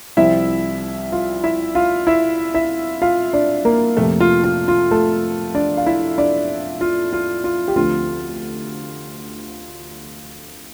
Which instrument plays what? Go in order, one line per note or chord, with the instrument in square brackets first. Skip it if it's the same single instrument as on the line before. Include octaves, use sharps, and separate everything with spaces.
[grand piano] C2 C3 F3 C4 E4 E5
F4 F5
E4 E5
F4 F5
E4 E5
E4 E5
F4 F5
D4 D5
A#3 A#4
F2 C3 F3 A3 A#3 A4
F4
F4
F4
A3 A4
D4 D5
F5
E4 E5
D4 D5
F4
F4
F4
G4
D2 D3 F3 A3 C4 F4